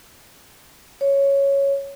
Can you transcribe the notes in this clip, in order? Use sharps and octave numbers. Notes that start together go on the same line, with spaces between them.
C#5